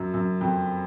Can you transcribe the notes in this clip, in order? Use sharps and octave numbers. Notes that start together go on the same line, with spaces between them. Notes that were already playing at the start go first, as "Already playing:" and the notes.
Already playing: F#2
F#2
F2